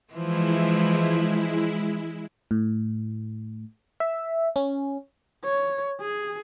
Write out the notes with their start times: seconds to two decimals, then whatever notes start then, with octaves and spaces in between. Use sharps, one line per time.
0.14 E3 F3 G#3 E4
2.51 A2
4.00 E5
4.56 C#4
5.44 C#5
6.01 G#4